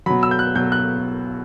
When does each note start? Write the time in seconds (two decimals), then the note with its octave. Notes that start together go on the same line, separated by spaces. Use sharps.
0.06 B2 F#3 B5
0.23 E6
0.31 G6
0.39 F#6
0.55 B2 F#3 G6
0.72 F#6